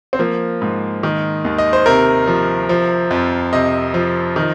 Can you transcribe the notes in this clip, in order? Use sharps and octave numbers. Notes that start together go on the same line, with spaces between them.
C4
F3 A#3
G#2
D#3
D#2
D#5
C5
C3 A#4
F3
F3
F2
C3 D#5
F3
D#3